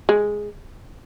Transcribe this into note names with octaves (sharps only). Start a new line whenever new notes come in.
G#3